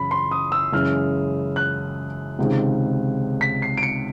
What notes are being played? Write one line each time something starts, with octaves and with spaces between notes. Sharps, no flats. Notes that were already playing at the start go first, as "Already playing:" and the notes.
Already playing: F#2 C#3 E3 B5
C6
D#6
E6
F#2 C#3 E3 G#3 F6
F#6
C#2 C3 D#3 G#3
B6
C7
D7
C#7